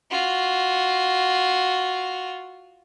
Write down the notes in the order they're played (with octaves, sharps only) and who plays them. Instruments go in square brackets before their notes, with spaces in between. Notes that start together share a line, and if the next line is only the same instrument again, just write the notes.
[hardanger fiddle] F4 F#4